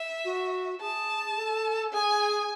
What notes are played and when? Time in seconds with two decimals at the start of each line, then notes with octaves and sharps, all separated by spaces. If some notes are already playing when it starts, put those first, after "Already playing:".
Already playing: E5
0.25 F#4
0.81 G#4 A5
1.37 A4
1.93 G#4 G#5